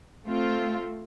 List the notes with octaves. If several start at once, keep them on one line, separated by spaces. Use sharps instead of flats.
A3 C4 F4